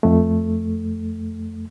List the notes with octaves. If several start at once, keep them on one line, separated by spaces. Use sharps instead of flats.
F2 A3